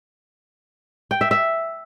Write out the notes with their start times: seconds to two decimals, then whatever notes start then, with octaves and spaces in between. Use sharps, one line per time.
1.11 G5
1.21 E5
1.31 E5